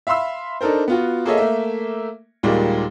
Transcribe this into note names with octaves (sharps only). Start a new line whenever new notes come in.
E5 F5 B5 C6 E6
D4 D#4 A4 A#4 C5
B3 F4 F#4
A#3 G#4 A4 C#5 D#5 E5
A3 A#3 E5
D#2 A#2 G3 G#3 A#3